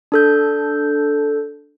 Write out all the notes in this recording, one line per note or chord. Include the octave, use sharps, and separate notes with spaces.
D4 A4 G6